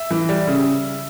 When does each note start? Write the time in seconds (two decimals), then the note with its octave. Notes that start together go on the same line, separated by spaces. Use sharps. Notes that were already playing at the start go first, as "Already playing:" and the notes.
Already playing: E5
0.10 E3
0.29 G3
0.47 C#3